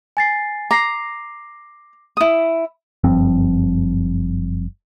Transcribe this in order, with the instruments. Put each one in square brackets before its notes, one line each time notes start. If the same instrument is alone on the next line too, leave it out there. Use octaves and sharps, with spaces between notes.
[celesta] G#5 A6 C7
[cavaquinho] A#5 [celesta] D6 A#6 C7
[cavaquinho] E4 D#6
[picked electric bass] F#1 G2 F3 C4